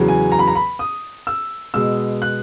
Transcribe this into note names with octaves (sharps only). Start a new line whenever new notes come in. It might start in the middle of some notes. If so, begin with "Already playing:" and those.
Already playing: E2 C#3 F#3
G#5
A#5
B5
A#5
B5
D#6
E6
B2 G#3 E6
F#6